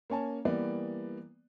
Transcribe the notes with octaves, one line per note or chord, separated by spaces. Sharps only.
A#3 C#4 C#5 G#5 A5
E3 G3 A#3 B3 D5